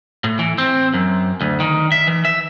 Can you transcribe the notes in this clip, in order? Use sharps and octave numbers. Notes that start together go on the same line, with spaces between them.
A2
E3
C4
F#2
D2
D#3
E5
E3
E5